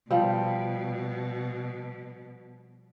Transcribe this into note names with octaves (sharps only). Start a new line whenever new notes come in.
B2 F3 G3